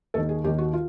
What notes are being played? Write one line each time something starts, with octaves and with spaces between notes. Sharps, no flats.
D#2 D#3 A4
G#4
D#2 D#3 G4
F#4
F4